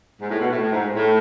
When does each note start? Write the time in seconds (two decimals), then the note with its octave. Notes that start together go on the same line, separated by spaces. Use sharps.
0.20 G#2
0.30 A2
0.40 B2
0.51 A2
0.62 A2
0.72 G#2
0.94 A2